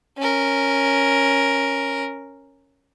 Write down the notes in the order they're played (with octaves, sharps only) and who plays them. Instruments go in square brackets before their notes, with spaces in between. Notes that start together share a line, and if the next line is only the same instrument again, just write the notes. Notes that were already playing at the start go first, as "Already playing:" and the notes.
[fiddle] C#4 A#4